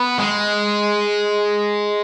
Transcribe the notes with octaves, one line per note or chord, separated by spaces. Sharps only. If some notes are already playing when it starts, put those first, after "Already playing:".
Already playing: B3
G#3